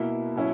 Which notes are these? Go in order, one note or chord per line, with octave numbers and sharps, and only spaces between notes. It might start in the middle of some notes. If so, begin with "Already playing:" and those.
Already playing: B2 A#3 E4
B2 F#3 C#4 E4